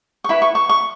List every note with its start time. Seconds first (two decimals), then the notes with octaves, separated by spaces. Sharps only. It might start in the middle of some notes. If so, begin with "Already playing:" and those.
0.24 C#6
0.29 E4 B4 B5
0.42 C#6
0.55 C#6
0.69 C#6